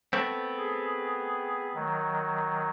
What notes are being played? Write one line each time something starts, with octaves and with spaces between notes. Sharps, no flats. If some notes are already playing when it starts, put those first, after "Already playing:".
A3 B3 C4
G#4
D#3 F#3